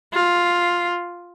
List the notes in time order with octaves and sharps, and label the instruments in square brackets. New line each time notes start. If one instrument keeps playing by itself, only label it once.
[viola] F4